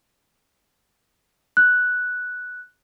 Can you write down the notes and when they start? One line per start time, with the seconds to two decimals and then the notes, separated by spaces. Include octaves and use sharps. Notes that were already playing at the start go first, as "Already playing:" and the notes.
1.57 F#6